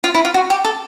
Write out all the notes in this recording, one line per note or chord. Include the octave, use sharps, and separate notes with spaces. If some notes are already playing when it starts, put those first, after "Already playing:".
F4
E4
F4
F#4
G4
A4